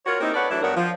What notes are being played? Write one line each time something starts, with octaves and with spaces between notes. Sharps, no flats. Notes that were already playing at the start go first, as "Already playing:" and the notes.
F4 F#4 A#4 C#5
A#3 C4 D#4 E4 G4 A#4
A4 B4 C#5 D5 F#5
E3 F#3 A3 D4 E4
G2 F#3 B3 F#4 A#4 D5
F3